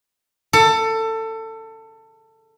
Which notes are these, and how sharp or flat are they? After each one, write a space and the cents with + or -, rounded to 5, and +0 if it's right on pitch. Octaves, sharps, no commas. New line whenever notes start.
A4 +20